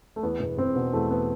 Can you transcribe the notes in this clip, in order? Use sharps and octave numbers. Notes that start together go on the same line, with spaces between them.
A3
E2 B3
E1
E1 C4
B2 B3
E2 A3
B3